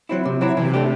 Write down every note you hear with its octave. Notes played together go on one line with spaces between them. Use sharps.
F#3 C4 E4
C3
F#3 C4 E4
C3 E3
A3 D4 G4